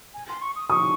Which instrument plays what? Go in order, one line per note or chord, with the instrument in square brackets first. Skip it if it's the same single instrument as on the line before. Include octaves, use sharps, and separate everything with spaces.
[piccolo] G#5
C6
C#6
D#6
[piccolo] C#6 [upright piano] D#6